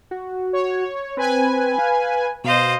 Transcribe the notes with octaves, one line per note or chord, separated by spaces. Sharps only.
F#4
C#5
C4 B4 G#5
F5
B2 C5 D#5 F5